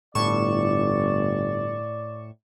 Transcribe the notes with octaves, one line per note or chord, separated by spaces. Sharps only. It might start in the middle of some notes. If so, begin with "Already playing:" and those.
G1 A2 D5 C#6 E7